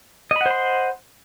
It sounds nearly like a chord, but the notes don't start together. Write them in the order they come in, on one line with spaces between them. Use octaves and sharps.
D#5 B5 F#5 C5 C6